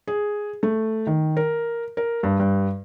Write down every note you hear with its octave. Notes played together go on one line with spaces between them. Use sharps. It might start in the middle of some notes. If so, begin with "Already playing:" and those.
G#4
A3
D#3
A#4
A#4
G2
G2